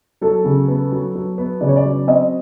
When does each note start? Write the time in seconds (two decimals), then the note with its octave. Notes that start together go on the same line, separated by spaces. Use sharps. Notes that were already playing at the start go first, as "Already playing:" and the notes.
0.21 F#3 A4
0.44 C#3
0.68 B3
0.92 F#3
1.15 F#3
1.38 B3
1.61 C#3 D5
1.68 C#5
1.76 D5
1.85 F#3
2.07 C4 D#5